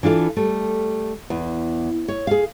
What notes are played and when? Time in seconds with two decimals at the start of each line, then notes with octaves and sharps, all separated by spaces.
0.03 E3 D4 F4 A4
0.37 G3 A3
1.30 E2
2.08 C#5
2.27 G#4 F5